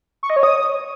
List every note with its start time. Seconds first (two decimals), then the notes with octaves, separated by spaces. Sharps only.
0.23 C#6
0.30 D#5
0.36 C#5
0.43 D#6